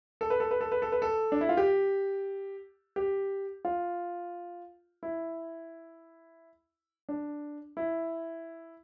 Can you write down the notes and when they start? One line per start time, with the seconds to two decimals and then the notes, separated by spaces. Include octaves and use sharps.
0.21 A4
0.30 B4
0.40 A4
0.51 B4
0.61 A4
0.72 B4
0.82 A4
0.92 B4
1.02 A4
1.32 D4
1.41 E4
1.49 F4
1.57 G4
2.96 G4
3.65 F4
5.03 E4
7.09 D4
7.77 E4